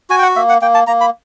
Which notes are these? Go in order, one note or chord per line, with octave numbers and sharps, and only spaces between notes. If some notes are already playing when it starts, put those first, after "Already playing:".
F#4 G#5
G5
F#5
A#3 E5
F#5
A#3 G5
A5
A#3 A#5
B5